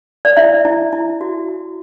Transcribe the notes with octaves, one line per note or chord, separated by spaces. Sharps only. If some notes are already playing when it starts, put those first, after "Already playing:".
D5
E4 E5
E4
E4
F#4
F#4